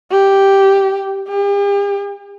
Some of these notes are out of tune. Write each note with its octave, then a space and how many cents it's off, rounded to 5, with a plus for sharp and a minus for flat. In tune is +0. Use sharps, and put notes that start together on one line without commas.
G4 +0
G4 +45